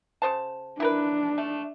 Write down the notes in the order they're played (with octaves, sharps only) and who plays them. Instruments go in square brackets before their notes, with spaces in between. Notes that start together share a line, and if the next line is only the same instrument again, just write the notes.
[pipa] C#3 C5 A5
[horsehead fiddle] D4 [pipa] E4 A#4 B4
[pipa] A3